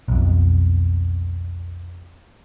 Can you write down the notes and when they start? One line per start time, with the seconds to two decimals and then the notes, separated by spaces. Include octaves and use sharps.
0.08 B1 F2